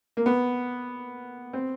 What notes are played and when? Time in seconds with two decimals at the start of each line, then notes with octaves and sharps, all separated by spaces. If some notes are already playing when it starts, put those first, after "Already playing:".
0.17 A#3
0.26 B3
1.53 C4